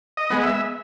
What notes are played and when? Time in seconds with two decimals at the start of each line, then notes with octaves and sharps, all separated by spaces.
0.17 D#5
0.30 G#3 B3
0.43 E5